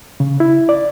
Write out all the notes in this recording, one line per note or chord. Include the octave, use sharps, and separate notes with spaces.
C#3
E4
D5